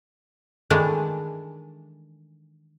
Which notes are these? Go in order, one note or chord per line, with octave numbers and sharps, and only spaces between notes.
D#3 E3 G#3 A3 D4 E4